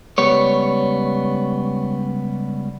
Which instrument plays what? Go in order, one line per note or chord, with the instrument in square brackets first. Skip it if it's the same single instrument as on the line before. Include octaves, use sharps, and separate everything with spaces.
[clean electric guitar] C#2 G3 B3 C#5